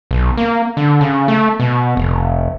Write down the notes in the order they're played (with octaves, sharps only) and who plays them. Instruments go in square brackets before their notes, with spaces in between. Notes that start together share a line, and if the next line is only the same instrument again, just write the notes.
[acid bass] B1
A#3
D3
C#3
A3
B2
F1